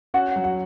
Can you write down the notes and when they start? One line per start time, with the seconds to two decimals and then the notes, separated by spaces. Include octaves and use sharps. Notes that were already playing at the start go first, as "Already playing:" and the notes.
0.14 C#4 F#4 F#5
0.36 F#3
0.44 F#4 F#5